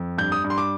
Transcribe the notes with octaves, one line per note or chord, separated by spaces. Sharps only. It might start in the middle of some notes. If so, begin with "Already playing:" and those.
Already playing: F2
G2 G6
D#6
G2
C6
D6